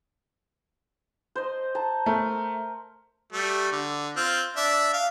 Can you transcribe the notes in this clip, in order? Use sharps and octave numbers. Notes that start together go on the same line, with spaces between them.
C5 D#5
A5 A#5
A3 A#4
G3 A3
D3
C4 F4
D4 E5
F5